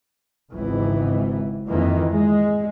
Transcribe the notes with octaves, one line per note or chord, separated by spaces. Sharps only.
G#1 C#2 G#2 E3
F2 D#3 E3 G#3 A#3
G#3